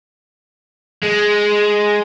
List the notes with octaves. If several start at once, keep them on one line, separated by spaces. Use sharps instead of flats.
G#3